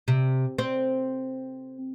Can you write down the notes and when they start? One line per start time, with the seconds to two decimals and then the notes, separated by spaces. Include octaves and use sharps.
0.08 C3
0.58 C4